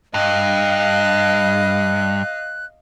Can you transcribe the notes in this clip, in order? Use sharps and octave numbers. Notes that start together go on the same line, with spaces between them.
G2 D#5 F5 F#6